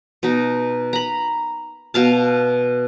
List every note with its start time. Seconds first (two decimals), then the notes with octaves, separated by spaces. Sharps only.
0.23 B2 D#4
0.93 A#5 B5
1.94 B2 F5 A5